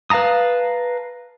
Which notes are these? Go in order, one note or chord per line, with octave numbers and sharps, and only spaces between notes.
B4 F5 A5 A#5 D#6